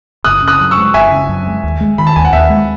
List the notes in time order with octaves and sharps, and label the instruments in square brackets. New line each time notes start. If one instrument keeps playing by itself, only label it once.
[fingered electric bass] F#1 [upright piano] D#6 F#6
[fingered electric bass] C#3
[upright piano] D#6 F#6
[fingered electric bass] F#2
[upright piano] C#6 E6
[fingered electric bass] G#3
[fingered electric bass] F#1 [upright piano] E5 G#5
[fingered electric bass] C#3
F#2
G#3
D#2
G#3
[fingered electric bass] D#3 [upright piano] B5
[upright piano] A5
[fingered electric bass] D#2 [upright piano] G#5
[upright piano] F#5
[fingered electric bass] D#2 [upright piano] E5
[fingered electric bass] G#3